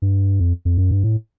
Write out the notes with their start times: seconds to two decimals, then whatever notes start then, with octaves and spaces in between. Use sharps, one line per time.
0.02 G2
0.40 F2
0.65 F2
0.78 F#2
0.91 G2
1.04 A2